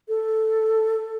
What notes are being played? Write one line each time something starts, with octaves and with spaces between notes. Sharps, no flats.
A4